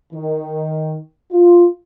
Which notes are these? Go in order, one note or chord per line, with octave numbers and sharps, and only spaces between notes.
D#3
F4